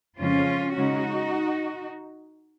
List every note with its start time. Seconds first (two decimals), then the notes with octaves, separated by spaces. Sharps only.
0.19 F2 C#3 F3 G#3 C#4 F4
0.76 C#3 G#3 C#4 D#4 F#4